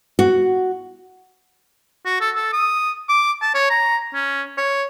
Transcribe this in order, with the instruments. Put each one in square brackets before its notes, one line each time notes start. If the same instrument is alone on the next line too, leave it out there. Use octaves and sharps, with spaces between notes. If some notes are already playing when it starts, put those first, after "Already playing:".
[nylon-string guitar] F#4
[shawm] F#4
A4
A4
D#6
D6
A5
C#5
A#5
C#4
C#5